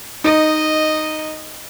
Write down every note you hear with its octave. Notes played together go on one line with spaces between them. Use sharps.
D#4 D#5